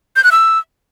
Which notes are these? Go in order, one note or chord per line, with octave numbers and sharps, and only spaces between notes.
G6
F#6
E6